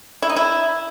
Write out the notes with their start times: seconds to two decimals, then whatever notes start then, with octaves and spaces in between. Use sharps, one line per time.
0.22 E4
0.29 D#4
0.36 E4